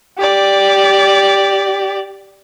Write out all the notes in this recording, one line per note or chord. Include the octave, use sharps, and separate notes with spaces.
G4 D5